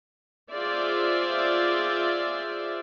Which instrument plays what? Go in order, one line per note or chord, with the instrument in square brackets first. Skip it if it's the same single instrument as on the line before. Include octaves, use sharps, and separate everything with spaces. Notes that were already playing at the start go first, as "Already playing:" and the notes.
[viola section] F4 G#4 C5 D5 E5